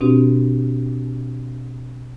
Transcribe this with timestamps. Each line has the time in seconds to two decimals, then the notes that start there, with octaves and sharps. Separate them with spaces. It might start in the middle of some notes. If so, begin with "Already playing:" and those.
0.01 B2 C4 D4 F#4 G4